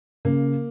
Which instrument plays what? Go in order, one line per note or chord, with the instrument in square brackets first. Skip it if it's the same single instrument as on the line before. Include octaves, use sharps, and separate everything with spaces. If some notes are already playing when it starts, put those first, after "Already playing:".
[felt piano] C#3 [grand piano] A#3